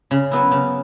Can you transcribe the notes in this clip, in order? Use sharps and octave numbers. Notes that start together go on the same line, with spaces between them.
C#3
F#3 B3 E4
C#3